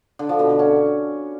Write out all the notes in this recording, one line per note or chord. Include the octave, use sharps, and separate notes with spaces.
D3
F3
B2
D3
C#4